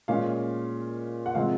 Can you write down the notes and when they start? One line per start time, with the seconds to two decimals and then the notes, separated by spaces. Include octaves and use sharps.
0.08 A#2 G#3 C#4 F5
1.26 F#5
1.35 C3 F3 G#3 C4 F5